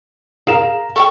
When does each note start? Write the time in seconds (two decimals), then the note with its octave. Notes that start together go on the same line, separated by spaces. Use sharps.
0.47 G#4 A#4 F5 A#5 E7
0.96 A4 F#5 G5 C#6